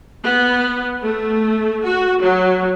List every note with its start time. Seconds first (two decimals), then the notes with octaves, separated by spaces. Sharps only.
0.24 B3
1.00 A3
1.83 F#4
2.20 F#3